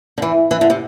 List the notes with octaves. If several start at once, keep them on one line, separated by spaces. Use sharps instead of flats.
D3
E3
E3
D3
C3